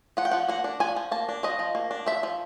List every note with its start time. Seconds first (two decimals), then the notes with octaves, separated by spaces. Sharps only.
0.17 F3 F#5
0.25 G5
0.31 F3 F#5
0.48 A#3 F#5
0.64 D4
0.80 F3 G#5
0.96 F3
1.11 A#3 A5
1.29 D4
1.43 F3 D#5
1.59 F3
1.75 A#3
1.91 D4
2.06 F3 E5
2.23 F3